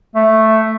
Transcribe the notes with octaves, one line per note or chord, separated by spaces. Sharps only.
A3